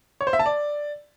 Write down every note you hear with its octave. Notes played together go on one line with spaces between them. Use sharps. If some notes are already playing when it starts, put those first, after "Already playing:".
C#5
C5
E5
A5
D5